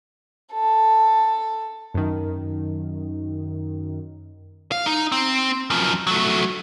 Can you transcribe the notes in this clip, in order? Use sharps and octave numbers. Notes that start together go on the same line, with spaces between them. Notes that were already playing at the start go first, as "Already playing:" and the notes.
A4
F#2 D#3
F5
D#4
C4
F#2 F3
F#3 A3